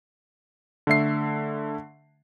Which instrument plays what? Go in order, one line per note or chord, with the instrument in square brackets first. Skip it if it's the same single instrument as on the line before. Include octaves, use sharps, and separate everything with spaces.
[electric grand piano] D3 A3 E5 C7